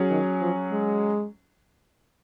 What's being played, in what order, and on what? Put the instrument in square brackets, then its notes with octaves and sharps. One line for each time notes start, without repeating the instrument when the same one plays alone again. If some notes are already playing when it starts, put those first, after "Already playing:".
Already playing: [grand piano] F#3 C#4 G#4
[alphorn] D#3
F3
G#3